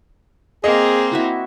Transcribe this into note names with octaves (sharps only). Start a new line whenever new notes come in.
A#3 C4 G#4 D#5
E4 F#4 E5